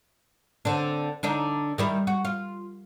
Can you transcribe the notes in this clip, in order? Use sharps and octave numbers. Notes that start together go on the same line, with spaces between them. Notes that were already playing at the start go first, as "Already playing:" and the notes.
D3 C4 D4
D3 D4 D#4
D#3 G3 E4
F#4
F4